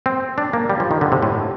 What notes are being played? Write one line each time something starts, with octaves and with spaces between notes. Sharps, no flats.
C4
D4
A#3
G3
F3
D#3
D3
C3
A2